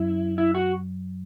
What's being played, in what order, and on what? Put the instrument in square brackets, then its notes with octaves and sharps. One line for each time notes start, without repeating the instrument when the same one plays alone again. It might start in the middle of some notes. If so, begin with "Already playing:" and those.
Already playing: [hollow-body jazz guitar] F#2 [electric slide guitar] E4
[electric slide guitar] E4
F#4